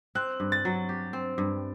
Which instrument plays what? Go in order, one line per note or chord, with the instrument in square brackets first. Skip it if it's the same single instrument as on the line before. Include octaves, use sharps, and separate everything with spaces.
[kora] C4 [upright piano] F#6
[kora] G2
[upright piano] A6
[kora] F#3
G4
C4
G2